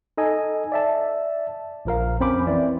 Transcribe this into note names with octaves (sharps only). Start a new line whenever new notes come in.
D#4 A4 D#5 G#5
D5 E5 A5
A#1 F3 A#4 F5
F2 C4 C#4 C5 B5 D6
E3 C4 E4 D5